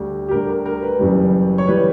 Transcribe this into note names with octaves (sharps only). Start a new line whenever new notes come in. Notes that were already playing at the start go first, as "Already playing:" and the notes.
Already playing: D2 D3 G3
G4
D2 D3 G3 A#4
A#4
A#4
B4
F#1 F#2 E3 G3
C#5
E3 G3 B4